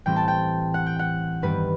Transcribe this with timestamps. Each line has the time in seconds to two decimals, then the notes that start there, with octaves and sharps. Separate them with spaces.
0.06 A2 E3 G3 C4 G5
0.16 A5
0.28 G5
0.74 F#5
0.86 G5
0.99 F#5
1.42 G2 D#3 G3 B3 B4